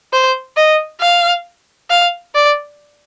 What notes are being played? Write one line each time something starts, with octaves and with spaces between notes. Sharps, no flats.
C5
D#5
F5
F5
D5